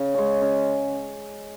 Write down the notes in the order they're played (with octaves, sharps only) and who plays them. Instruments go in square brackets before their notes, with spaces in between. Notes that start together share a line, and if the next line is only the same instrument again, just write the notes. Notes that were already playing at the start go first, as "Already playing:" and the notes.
Already playing: [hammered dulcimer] C#3
G#3 C#4
C#3